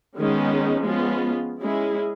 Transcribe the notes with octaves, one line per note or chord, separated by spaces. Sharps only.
D#3 G#3 B3 C#4 D#4
F3 G#3 B3 C#4 F4
G#3 C#4 E4 G#4